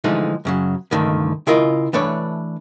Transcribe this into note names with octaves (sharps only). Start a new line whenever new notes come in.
D3 E3 F3 G#3 A3 D#4
F#2 C#3 F#3
C#2 G2 D3 D#3 A3
C#3 E4 F4 A#4 D#5
E3 A3 D4 B4 C#5 D5